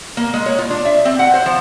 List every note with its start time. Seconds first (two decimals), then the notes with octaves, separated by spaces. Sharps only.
0.17 A#3
0.33 G#3
0.46 C#5
0.59 F4
0.70 D4
0.85 E5
1.05 C4
1.19 F#5
1.34 C5
1.46 F3